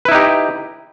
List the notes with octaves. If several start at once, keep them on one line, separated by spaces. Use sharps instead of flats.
D#4 E4 G4 B4